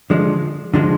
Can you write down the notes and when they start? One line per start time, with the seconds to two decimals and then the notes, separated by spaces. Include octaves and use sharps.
0.10 D3 F3 G#3
0.74 D3 F3 G#3